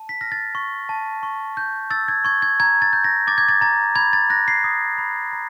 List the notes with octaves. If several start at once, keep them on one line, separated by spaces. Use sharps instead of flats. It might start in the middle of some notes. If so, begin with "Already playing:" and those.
Already playing: A5
B6
F6 A#6
A6
C#6
A5
C#6
G6
E6 A6
G#6
C#6 G#6
G#6
A#5 G#6
A6
G6
A#6
D6 A6
G#6
A6
A#5 A6
B5 G#6
A6
F#6 A#6
C7
D#6
B5
A#5